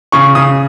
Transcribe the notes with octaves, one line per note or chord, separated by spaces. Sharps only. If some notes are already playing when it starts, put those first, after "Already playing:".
C#3 C#6
C#3 D#6